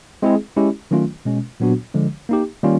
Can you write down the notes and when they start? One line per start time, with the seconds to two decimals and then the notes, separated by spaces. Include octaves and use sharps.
0.22 G#3 C4 E4 G#4
0.57 G#3 C#4 E4 G4
0.91 D#3 F#3 A3 C#4 F4
1.25 B2 G#3 C#4
1.60 A#2 F#3 B3 D4 F#4
1.94 D3 F3 G#3
2.29 A#3 D#4 G4
2.63 D#3 G3 A#3 C#4 F4